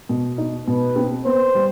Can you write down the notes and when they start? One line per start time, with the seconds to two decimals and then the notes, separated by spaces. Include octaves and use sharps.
0.09 B2
0.38 D#4
0.67 B2 B4
0.96 C4
1.25 B3 C5
1.55 G3